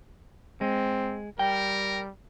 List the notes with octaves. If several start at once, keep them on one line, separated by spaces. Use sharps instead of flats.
G#3 C4
G3 A#4 G5